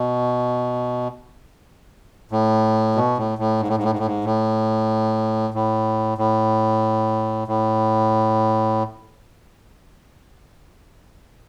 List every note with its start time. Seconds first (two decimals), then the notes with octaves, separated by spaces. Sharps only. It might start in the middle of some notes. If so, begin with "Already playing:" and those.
Already playing: B2
2.31 A2
2.95 B2
3.18 A2
3.38 A2
3.61 G#2
3.68 A2
3.76 G#2
3.83 A2
3.91 G#2
3.99 A2
4.06 G#2
4.25 A2
5.54 A2
6.18 A2
7.48 A2